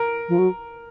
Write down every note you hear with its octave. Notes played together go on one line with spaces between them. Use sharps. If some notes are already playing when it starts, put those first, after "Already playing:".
Already playing: A#4
F3
F#3